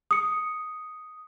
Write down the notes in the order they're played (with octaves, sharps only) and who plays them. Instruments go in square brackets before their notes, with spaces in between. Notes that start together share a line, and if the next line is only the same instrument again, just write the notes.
[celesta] D#6 C#7